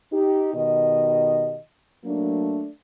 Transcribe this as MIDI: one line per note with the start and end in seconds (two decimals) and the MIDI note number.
0.13 0.53 63
0.13 0.53 67
0.54 1.58 47
0.54 1.58 51
0.54 1.58 67
0.54 1.58 75
2.05 2.68 54
2.05 2.68 57
2.05 2.68 58
2.05 2.68 62